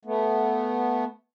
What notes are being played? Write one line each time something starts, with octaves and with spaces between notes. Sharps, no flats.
A3 B3